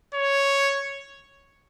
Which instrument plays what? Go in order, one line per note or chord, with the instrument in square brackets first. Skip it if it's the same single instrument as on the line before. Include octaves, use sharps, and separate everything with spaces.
[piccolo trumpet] C#5